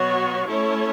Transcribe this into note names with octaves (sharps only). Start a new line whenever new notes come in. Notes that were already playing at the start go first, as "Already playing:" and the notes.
Already playing: B2 F#3 B3 F#4 C#5
A3 C#4 E4 A4 C#5